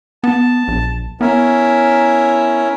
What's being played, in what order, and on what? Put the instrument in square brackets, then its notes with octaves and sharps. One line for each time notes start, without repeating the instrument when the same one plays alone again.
[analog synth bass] B3 [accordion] A5
[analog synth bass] A#1
[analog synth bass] B3 [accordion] C#4 E4 A#4